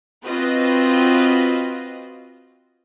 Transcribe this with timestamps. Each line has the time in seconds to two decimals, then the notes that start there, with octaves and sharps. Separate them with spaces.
0.23 C4 F4 F#4 B4 D#5